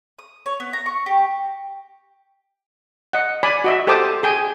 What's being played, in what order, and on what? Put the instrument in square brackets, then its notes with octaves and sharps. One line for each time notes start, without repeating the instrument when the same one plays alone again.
[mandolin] D#6
C#5
B3
A#5
C#6
G4
[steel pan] D#5 F#5
D5 G#5 B5
F#4 D#5 E5
G4 A4 C5 A5 D6 D#6
G#4 G5 G#5